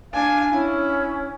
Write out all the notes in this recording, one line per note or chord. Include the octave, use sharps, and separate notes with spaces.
D4 F5 G#5
C#4 E4